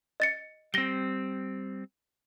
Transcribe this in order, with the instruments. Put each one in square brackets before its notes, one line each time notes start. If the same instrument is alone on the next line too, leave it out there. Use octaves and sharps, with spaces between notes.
[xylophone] D#5 A6 C#7
[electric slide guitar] G3 C4 [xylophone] A#6 G7